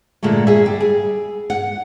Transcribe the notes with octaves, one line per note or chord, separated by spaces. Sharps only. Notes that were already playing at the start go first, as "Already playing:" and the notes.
A#2 D3 G#3 A3
G#4 E5
G3
G#4
F#5